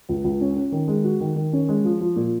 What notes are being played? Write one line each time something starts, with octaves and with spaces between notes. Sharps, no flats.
C#2
C#2
C#4
C#4
D#3
G#3
F#4
D#3
D#3
C#4
G#3
F3
F3
A#2